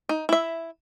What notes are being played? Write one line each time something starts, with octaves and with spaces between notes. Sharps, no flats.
D#4
E4 E5